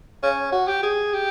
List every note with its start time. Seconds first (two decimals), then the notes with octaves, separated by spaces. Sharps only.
0.23 C#4
0.52 F#4
0.68 G4
0.83 G#4
1.13 G4